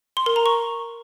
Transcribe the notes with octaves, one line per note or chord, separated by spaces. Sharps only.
C6
A#4
A#5
C#6